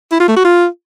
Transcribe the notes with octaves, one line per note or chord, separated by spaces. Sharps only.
E4
F4
A3
F#4
F4